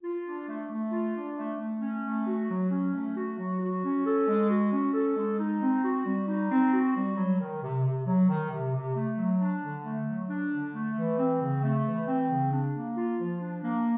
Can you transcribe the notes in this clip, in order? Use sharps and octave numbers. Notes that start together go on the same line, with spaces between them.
F4
D4
A3
A3
F4
D4
A3
A3
C#4
A3
F#4
F#3
C#4
A3
F#4
F#3
F#4
C#4
A4
G#3
F#4
C#4
A4
G#3
D#4
C4
F#4
G3
D#4
C4
F#4
G3
F#3
D#3
C3
C3
F#3
D#3
C3
C3
A3
F#3
D4
D3
A3
F#3
D4
D3
A3
E3
C4
C#3
A3
E3
C4
C#3
D4
A#3
F4
F3
D4
A#3